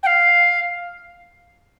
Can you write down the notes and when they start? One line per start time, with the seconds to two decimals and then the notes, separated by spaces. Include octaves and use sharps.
0.03 G5
0.06 F5